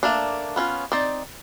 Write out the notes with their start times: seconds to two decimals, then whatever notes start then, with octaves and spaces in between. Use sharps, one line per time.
0.03 A3 A#3 D4
0.56 B3 C#4 E4 F4
0.92 C4 D#4 D5